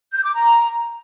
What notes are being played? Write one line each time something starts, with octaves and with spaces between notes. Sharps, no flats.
G6
D6
A#5